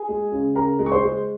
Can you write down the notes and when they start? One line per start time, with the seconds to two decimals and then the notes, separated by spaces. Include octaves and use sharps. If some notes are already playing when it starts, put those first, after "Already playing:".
Already playing: G#4 G#5
0.09 G#3
0.32 C#3
0.55 C#3 A#4 A#5
0.79 G#3
0.86 C#6
0.92 C5 C6
1.03 G#3